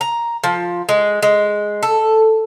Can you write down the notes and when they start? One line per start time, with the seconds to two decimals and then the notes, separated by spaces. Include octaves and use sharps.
0.01 A#5
0.44 F3
0.89 G#3
1.22 G#3
1.83 A4